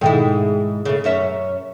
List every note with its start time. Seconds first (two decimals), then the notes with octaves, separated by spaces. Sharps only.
0.01 G#2 B2 D#3 G#3 E4 G5
0.85 C#3 A3
1.04 F#2 C#4 E5